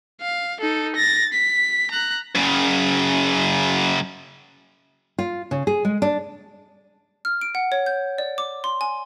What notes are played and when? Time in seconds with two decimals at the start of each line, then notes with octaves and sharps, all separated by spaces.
0.21 F5
0.61 D#4 A4
0.96 A6 A#6
1.33 B6
1.91 A#5 F#6
2.35 F#2 C#3
5.18 F4
5.51 C#3
5.67 G#4
5.85 G#3
6.02 D4
7.25 F6
7.41 D7
7.55 F#5
7.72 C#5
7.86 G6
8.18 D5
8.38 D6
8.64 C6
8.81 G#5